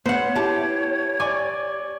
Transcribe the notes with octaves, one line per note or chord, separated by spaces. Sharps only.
B3 C5 C#5 F#5
E4 G4 A5
D5 G#5 C#6 D6